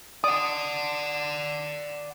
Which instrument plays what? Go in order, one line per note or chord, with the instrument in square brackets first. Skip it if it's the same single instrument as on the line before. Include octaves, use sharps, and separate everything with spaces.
[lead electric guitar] D5 F#5 [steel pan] D#6